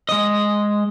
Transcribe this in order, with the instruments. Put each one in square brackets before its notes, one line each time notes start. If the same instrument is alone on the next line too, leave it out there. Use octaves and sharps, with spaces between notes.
[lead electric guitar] G#3 D#5